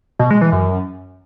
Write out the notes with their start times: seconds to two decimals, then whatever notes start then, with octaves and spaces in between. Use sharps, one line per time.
0.19 B2
0.30 G#3
0.41 E3
0.52 F#2